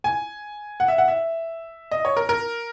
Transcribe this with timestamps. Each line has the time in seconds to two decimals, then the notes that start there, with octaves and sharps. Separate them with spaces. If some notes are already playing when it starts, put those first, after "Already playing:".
0.04 G#5
0.80 F#5
0.88 E5
0.98 F#5
1.08 E5
1.91 D#5
2.05 C#5
2.17 A#4
2.29 A#4